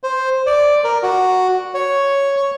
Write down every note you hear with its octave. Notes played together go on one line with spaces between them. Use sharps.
C5
D5
A#4
F#4
C#5
C#5